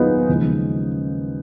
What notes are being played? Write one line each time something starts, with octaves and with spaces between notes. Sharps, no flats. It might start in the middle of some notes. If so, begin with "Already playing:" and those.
Already playing: D#2 D#3 F#3 A#3 B3 D#4 F4 G#4
D#2 C#3 F3 G#3